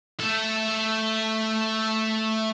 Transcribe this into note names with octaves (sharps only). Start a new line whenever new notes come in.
A3 A4